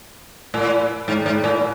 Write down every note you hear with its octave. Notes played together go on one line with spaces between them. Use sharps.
A2
G#2
G#2
A2